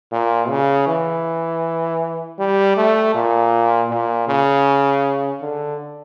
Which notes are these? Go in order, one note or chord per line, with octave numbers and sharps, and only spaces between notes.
A#2
C#3
E3
G3
A3
A#2
A#2
C#3
D3